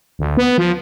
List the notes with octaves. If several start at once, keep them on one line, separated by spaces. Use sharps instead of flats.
D2
B3
F3